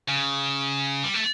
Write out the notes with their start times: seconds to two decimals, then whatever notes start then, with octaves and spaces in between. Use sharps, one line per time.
0.09 C#3
1.04 G3
1.14 A3